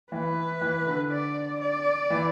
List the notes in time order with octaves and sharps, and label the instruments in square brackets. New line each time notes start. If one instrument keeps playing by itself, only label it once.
[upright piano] E3 [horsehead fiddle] B4
[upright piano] E3
D3
[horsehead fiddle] D5
D5
[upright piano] E3